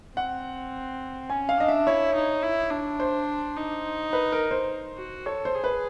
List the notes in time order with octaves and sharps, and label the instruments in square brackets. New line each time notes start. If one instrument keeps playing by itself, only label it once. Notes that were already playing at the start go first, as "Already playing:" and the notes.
[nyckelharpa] C4 [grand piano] F#5
[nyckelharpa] C#4 [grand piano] G#5
[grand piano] F5
[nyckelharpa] D4 [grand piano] D#5
[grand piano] E5
[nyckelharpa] E4 [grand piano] C#5
[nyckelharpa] D#4
E4
D4
[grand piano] C5
[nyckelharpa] D#4
[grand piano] B4
A#4
C5
[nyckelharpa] F#4
[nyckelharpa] A4 [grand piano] C#5
[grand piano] C5
[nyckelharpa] G#4
[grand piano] B4